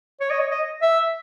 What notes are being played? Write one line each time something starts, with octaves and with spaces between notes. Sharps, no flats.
C#5
D#5
C#5
D#5
E5